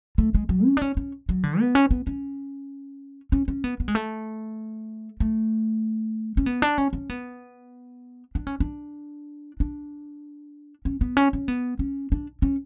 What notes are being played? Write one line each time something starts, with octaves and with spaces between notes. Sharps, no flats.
A3
G#3
F#3
C#4
D4
C#4
C#4
F#3
D3
B3
C#4
B3
C#4
C#4
C#4
B3
B3
G#3
A3
A3
C#4
B3
D4
C#4
C#4
B3
D4
C#4
D4
D4
C#4
B3
C#4
C#4
B3
C#4
D4
C#4